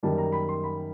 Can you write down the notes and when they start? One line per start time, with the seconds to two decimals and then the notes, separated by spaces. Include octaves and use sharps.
0.03 F#2 D#3 G3 A#3 A5
0.18 A#5
0.32 B5
0.49 C6
0.64 B5